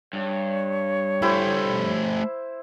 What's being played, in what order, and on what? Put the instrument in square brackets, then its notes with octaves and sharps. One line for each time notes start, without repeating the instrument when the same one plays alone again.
[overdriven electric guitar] G2 [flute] C#5
[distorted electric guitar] A3 G4 [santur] E4 C5